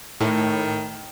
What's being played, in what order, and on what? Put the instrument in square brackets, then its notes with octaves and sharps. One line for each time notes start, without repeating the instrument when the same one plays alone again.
[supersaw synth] A2 [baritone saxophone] D#3